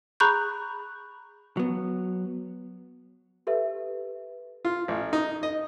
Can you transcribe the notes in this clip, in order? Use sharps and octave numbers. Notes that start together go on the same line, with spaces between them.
G#4 A#5 B5 C#6 F#6 G6
F#3 B3
G4 A4 B4 E5
F4
A1
D#4
D#5